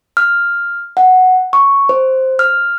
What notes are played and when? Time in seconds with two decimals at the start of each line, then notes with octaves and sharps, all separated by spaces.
0.17 F6
0.97 F#5
1.53 C#6
1.89 C5
2.39 F6